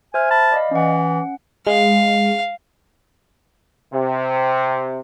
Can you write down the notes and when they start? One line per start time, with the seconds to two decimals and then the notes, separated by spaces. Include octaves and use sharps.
0.14 C5 E5 G#5 F6
0.31 A5 B5
0.52 D5 D#5 F5
0.71 E3 C#4 F#5
1.67 G#3 F5
3.94 C3